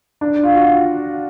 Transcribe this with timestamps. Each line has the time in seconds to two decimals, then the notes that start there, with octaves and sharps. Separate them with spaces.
0.21 D4
0.43 F4
0.55 F#4